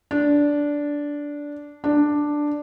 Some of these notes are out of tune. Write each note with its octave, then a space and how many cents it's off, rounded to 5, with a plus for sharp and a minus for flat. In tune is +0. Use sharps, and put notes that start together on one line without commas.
D4 -10
D4 +5